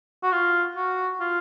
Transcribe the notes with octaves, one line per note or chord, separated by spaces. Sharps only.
F#4
F4
F#4
F4